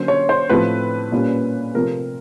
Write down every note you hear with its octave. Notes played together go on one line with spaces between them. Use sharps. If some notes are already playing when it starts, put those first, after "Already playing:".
Already playing: D3 F#3 A#3 C#4 C5
C#5
C5
A2 F3 A3 C4 B4
A#2 G3 A#3 C#4
C3 F3 A3 C4 A#4